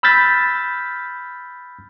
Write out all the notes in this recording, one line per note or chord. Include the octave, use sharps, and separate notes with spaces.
B5 E6 F6 G6 A6 B6